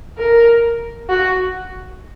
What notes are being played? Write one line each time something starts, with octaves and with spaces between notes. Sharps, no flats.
A#4
F#4